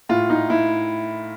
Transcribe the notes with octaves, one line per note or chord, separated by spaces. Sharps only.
A2 F4
A2 D#4
A2 E4